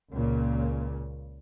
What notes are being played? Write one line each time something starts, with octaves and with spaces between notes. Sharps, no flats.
C#2 A#2 C#3